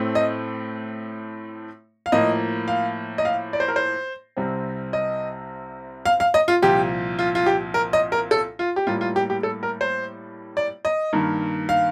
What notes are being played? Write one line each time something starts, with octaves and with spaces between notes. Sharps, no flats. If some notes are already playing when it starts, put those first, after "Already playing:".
Already playing: A2 A3 C4
D#5
F5
A2 F3 A#3 D#5
F5
D#5
F5
D5
C5
A#4
C5
C2 C3 G3 C4
D#5
F5
F5
D#5
F4
C2 A#2 F3 G4
F4
F4
G4
A#4
D#5
A#4
A4
F4
G4
A2 G3 A#3 F4
F4
G4
G4
A4
A#4
C5
D5
D#5
G2 D#3 A#3
F5